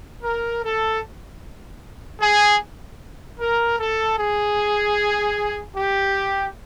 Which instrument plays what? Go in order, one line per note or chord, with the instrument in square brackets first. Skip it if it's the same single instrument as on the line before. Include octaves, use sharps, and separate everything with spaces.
[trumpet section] A#4
A4
G#4
A#4
A4
G#4
G4